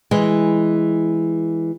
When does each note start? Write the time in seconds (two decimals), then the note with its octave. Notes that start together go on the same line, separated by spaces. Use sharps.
0.11 E3 G#3